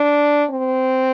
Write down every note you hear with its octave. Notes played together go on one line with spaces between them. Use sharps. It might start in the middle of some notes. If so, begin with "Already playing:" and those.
Already playing: D4
C4